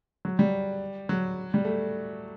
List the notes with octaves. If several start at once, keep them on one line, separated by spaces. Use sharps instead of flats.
F#3
G3
F#3
G3
A3